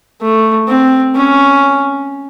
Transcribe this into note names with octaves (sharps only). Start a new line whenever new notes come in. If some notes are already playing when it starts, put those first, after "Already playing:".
A3
C4
C#4